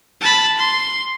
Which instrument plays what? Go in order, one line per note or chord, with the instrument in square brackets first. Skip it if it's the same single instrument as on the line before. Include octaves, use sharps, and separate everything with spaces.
[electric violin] A5 B5
C6